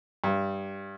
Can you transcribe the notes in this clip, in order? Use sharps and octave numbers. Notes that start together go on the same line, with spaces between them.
G2